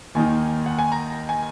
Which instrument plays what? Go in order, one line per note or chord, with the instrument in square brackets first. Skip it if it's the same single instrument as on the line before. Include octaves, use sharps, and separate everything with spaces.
[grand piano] D#2 D#3 A#3 D#4 G#5
F#5
G#5
A#5
G#5